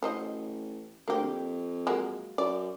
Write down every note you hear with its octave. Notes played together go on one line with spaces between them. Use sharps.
A1 F#3 C5 D#5
D2 A#3 G4
F2
F#3 G#3 A#3
F#2 D5